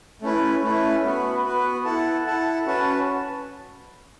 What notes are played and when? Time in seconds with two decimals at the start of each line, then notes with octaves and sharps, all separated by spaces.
0.22 A3 C#4 E4 B4
0.63 A3 C#4 E4 B4
1.03 B3 F#4 B4
1.45 B3 F#4 B4
1.85 E4 A4 F#5 A5
2.26 E4 A4 F#5 A5
2.66 C#4 F#4 B4 A5